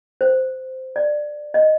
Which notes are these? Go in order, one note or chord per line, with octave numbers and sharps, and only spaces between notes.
C5
D5
D#5